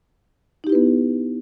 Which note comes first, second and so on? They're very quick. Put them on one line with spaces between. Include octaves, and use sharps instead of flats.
D#4 G4 E4 B4 B3